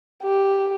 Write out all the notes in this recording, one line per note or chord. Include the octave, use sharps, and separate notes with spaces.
G4